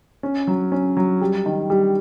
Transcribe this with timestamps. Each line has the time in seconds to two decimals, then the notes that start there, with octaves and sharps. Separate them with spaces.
0.23 C#4
0.47 F#3
0.72 C#4
0.97 F#3
1.21 G3
1.46 D#3
1.70 G3